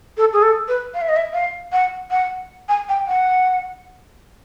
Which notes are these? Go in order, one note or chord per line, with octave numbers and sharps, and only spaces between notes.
A4
G#4
A4
B4
F5
E5
D#5
E5
F5
F#5
F#5
G#5
G5
F#5